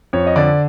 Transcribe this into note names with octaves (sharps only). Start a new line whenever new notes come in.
F2 C#5
D#5
D3 D5